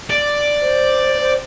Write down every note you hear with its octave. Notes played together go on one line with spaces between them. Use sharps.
D5
C5
C5